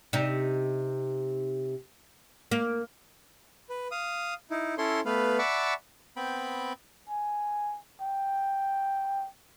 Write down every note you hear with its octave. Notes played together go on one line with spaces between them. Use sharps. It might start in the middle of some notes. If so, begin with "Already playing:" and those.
C3 D#4
A#3
B4
F5 D#6
D#4 E4
C#4 E4 A4 C#5 C6
A3 B3 B4 F5
D5 E5 F#5 A5 B5 C#6
B3 C4 G5 B5
G#5
G5